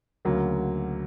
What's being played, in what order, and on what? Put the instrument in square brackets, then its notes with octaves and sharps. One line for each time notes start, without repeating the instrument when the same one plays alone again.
[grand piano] D2 C#3 F#3 A#3